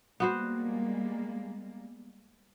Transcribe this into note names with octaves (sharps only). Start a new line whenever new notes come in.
G3 G#3 A#3 B3 F#4 C5